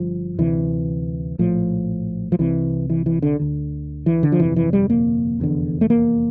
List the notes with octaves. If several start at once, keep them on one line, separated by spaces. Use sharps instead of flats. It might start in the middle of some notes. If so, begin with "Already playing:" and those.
Already playing: G1 G2 F3
D2 C3 E3
A#1 A2 F3
F3
C2 C3 E3
E3
E3
D3
D2 D3
E3
D3
F3
G1 F2 C3 E3
E3
G3
A#3
F1 E2 D3
A3
A#3